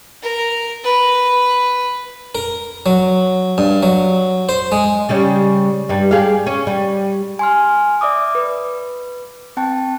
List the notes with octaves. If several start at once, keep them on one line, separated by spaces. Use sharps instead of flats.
A#4
B4
A#4
F#3
G2
F#3
C5
G#3
C#3 G3 C#4
G2 G3
G4 G#4 F5
C#4
G3
G#5 C6 F6
D5 E5 D6 D#6
B4
C4 G5 A5